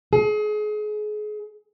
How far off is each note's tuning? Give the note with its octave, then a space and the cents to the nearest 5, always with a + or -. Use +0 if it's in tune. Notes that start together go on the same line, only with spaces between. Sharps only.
G#4 +30